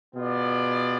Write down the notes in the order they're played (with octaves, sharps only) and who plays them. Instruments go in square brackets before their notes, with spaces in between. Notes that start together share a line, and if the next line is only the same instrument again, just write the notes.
[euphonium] B2 [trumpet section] B3 F4 G#4 D5